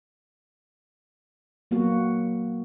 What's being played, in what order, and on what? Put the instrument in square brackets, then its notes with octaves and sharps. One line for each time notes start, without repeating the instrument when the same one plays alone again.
[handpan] F#3 A#3 B3 F#4